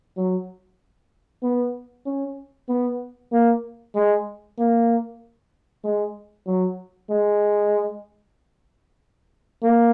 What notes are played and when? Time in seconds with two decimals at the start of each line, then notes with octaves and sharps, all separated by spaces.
0.17 F#3
1.43 B3
2.06 C#4
2.69 B3
3.32 A#3
3.95 G#3
4.58 A#3
5.84 G#3
6.47 F#3
7.10 G#3
9.62 A#3